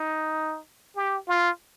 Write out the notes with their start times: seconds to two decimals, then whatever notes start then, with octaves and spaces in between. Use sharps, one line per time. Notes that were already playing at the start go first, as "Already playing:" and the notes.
Already playing: D#4
0.96 G4
1.28 F4